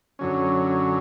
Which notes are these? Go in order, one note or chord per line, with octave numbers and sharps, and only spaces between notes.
F#2 D3 F#3 C#4